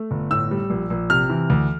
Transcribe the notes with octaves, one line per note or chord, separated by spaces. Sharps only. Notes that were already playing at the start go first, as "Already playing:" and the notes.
Already playing: A3
G1
A2 E6
G3
A#1
A#1
C3 F6
E3
D2